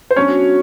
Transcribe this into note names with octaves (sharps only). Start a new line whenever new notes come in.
C5
F#3 B3 C#4 D4 F#4 C#5